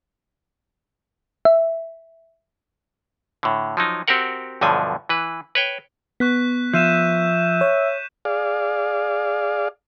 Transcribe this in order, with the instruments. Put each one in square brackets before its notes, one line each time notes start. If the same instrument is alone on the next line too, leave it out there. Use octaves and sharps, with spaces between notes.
[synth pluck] E5
[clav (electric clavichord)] A2 D3
F3 F#3 D#4
C4 F#4 G4 A#4 F#5
B1 G2 B2 D3 F3 G#5
E3 B4
B4 C#5 G5
[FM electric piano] B3 [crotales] C#6 F#6 B6
[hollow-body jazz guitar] F3 [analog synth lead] E5 [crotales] G6 D#7 E7
[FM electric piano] C#5
[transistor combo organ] G#4 D5 F5